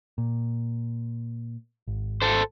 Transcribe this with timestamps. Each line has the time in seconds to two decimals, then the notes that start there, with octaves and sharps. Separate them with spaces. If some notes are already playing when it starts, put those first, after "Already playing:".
0.18 A#2
1.87 G#1
2.22 A4 C5